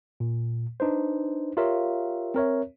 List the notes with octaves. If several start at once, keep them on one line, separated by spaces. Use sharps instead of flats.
A#2
D4 D#4 B4 C5
F4 G4 A#4 C#5 E5 F5
C4 A#4 C#5 E5